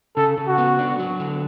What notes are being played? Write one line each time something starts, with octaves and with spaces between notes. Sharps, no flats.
C#3 A4
C#3
F#4
B3
D4
F#3
D3